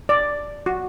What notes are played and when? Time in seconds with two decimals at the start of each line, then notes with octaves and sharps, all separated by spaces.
0.09 D5
0.66 F#4